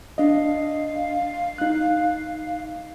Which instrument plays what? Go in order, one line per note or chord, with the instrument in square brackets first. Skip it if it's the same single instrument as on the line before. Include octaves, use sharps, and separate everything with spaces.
[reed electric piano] D4 D#5 [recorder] F5
[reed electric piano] D#4 F#6